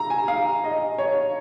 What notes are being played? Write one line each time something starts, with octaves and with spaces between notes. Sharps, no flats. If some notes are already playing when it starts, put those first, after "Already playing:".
Already playing: A#5
G#5
F5
D#5
C#5